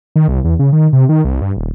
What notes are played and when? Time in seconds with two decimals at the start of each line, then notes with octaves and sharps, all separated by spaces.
0.16 D#3
0.28 C2
0.44 E2
0.59 C#3
0.73 D#3
0.93 C3
1.09 D#3
1.25 C2
1.42 G2
1.57 D#1